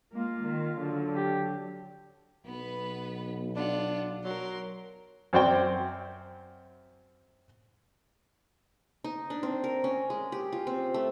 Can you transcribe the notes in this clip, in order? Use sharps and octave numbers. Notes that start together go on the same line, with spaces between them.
G#3 A#3 F4
D#3
D3 F#3
G4
B1 B3 B4
D4 F4 F#5
F#3 A#4 C6
F#2 C4 F#4 C5 D5 G5
D#4
D4
C4
A#4
C#4
G#3
G4
F4
C4
A3